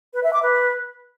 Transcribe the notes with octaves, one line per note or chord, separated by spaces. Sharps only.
B4
E5
D6
B4